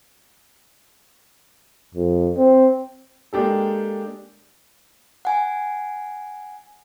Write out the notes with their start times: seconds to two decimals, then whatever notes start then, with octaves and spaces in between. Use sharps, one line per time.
1.95 F2
2.37 C4
3.33 G#3 A#3 D4 G4 A4
5.25 F#5 G#5